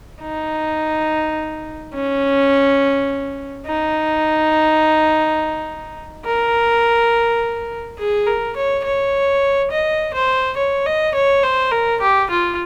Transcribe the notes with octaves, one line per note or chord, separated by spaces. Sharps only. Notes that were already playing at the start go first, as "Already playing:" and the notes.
D#4
C#4
D#4
A#4
G#4
A#4
C#5
C#5
D#5
C5
C#5
D#5
C#5
C5
A#4
G4
F4